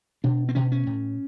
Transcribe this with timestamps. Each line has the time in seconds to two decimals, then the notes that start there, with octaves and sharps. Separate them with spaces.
0.24 B2 D4
0.49 C4
0.55 B2 C#4
0.72 C#4
0.87 A2